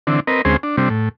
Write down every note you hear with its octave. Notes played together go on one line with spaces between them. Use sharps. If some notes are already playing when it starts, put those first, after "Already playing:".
D3 E3 C4 D4
C4 A#4 B4 D#5
D2 G#3 C4 C#4 G#4 C5
D4
C3 G3 C4 D4
A2